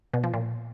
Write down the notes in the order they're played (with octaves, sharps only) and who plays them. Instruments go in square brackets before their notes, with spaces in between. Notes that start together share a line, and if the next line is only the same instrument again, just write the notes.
[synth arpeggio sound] B2
F3
A#2